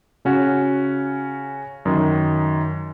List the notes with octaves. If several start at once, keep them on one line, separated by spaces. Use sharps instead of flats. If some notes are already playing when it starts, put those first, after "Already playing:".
C#3 C#4 F#4
F#2 D#3